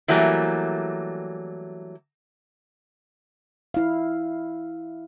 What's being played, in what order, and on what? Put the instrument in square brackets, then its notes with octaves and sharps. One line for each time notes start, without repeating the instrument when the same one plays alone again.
[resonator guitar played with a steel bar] E3 F#3 G3 A3 A#3
[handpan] E4 F5